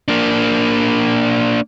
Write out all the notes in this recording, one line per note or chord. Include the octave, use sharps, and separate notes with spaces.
A#3 D4